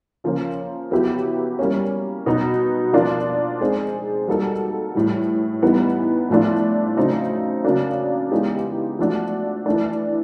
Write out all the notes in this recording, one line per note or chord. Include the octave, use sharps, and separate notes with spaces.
C#3 F3 A#3 C#4
F#3 B3 E4 G4
G3 A#3 C#4
B2 F#3 B3 D#4
F3 A#3 D4 F4
G#3 C4 D#4 G#4
G3 A#3 D#4 F#4 A4
A2 E3 G3
E3 G3 B3 D#4
A2 F3 A3 D4 F4
C#3 F#3 A3 C4 D#4
C#3 F#3 A#3 D4
E3 G#3 B3 D#4 G4
F3 A3 D4 F#4
E3 A3 D4